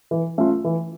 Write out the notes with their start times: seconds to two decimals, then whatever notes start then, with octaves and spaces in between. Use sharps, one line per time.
0.11 E3
0.38 A3 C#4 F4
0.64 E3